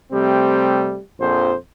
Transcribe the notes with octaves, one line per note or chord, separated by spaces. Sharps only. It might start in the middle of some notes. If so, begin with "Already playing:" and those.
C3 G3 A3 C4
A#1 F2 C5